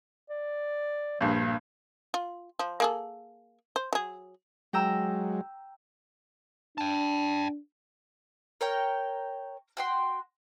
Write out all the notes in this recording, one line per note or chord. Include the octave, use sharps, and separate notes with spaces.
D5
A#1 G2 F3
F4
F3
A#3 G#4 A4
C5
F#3 G#4
F#3 G#3 G5 A#5 E6
D4 G5 A5
A#4 C#5 G5
F#4 G5 C6